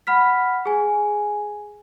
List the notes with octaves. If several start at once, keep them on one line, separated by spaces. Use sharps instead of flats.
F#5 B5 F6 B6
G#4 G#5